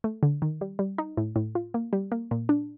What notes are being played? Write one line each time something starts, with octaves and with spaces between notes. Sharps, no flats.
A3
D3
D#3
G3
G3
D#4
A2
A2
F4
A#3
G3
A#3
A#2
D4